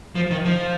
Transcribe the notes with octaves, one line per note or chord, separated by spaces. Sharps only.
F3
D#3
F3